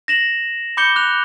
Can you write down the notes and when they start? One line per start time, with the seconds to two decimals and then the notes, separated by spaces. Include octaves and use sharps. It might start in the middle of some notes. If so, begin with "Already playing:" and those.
0.08 A#6 E7 F#7
0.77 B5 D6 G6 C#7 G7
0.96 D6 F#6 F7